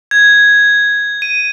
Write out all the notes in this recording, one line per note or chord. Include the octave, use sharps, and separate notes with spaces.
G#6
D#7